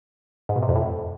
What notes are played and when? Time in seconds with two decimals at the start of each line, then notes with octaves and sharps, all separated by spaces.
0.49 G#2
0.56 B2
0.62 C3
0.69 F2
0.76 A2